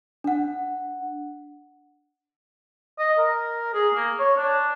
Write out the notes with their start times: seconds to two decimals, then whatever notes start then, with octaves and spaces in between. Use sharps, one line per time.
0.24 D4 F#5
2.99 D#5
3.19 A#4
3.74 G#4
3.94 A#3
4.19 C#5
4.37 D4